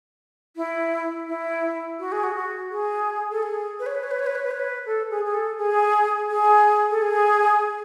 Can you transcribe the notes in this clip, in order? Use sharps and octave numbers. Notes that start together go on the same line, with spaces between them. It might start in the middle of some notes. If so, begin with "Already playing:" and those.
E4
E4
F#4
G#4
F#4
F#4
G#4
A4
G#4
B4
C#5
B4
C#5
B4
C#5
B4
C#5
B4
C#5
B4
A4
G#4
G#4
A4
G#4
G#4
A4
G#4